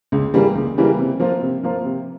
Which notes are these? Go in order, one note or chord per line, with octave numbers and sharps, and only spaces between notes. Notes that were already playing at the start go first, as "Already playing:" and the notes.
C#2
C#3 E3 G3 A#3
C#2
C#3 E3 G3 A#3
C3
F3 A#3 F4
C3
F3 A#3 F4
C3